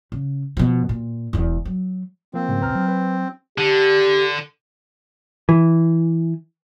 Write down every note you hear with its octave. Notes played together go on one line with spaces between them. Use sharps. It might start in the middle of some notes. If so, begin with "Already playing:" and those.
C#3
B2 F3
A#2
E1 E2
F#3
F3 A#3 C4
G#2 C#3 A3
D#1 A#1 C#3 B4 A#5 F6
F#3
B4
D3 G4
E3